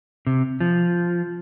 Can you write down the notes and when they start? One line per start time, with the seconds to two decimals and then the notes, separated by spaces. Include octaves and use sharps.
0.26 C3
0.60 F3